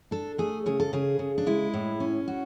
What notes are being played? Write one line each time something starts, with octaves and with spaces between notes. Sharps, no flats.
D4 A4
A3 G#4
C#3 G#4
A4
C#3 G#4
C#3
D4
G#3 E4
A2
C#4
F#4